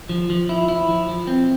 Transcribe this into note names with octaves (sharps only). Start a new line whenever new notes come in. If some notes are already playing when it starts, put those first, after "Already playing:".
F3
F3
E4
E4
F3
F3
C4